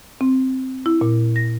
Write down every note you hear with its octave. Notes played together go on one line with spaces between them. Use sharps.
C4
E4
A#2
A#6